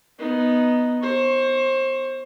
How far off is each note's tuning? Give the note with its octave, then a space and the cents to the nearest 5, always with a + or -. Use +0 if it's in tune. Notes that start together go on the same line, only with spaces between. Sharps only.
B3 +0 D#4 +0
C5 +25 C#6 +0